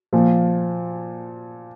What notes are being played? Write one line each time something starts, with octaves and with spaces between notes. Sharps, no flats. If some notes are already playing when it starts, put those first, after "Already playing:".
A#2 F3